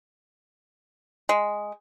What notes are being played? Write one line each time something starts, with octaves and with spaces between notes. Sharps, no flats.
G#3